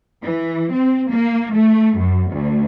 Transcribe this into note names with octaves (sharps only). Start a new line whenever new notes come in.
E3
C4
A#3
A3
F#2
D2